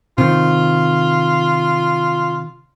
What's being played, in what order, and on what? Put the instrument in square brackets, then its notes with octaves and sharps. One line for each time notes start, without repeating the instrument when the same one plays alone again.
[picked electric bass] C3 D#3 [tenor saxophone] F4